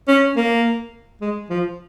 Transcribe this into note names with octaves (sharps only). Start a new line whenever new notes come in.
C#4
A#3
G#3
F3